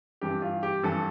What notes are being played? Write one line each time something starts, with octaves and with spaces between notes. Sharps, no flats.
G2 E3 G4
F4
G4
G2 E3 A4